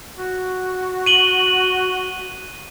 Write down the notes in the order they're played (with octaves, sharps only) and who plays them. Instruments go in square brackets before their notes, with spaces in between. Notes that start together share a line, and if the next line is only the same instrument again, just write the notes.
[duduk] F#4
[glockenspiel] D#7 F#7 G7